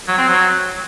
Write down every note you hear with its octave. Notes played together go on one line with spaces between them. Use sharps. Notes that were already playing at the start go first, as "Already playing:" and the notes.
F#3
C4
F#3